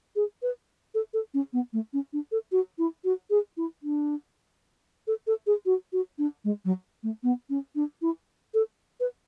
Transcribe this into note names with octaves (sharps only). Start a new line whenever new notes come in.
G#4
B4
A4
A4
C#4
B3
A3
C#4
D4
A4
F#4
E4
F#4
G#4
E4
D4
A4
A4
G#4
F#4
F#4
D4
G#3
F#3
A3
B3
C#4
D4
E4
A4
B4